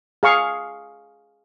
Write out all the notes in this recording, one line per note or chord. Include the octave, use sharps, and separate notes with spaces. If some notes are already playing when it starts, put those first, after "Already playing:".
G#4 F5 C#6